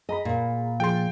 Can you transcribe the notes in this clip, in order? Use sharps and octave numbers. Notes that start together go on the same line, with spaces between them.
G#4 D#5 A#5 B5
A#2
F3 G#4 G5 C6 A6